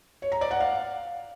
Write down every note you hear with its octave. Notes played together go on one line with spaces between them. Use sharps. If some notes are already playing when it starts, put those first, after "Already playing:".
C#5
A#5
D5
F#5
F5